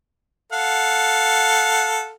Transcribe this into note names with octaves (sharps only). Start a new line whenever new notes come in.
A4 F5 F#5